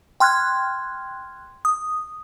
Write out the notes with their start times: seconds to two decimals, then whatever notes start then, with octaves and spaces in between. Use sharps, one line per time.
0.20 G5 C6 F6 F#6 G#6
1.65 D#6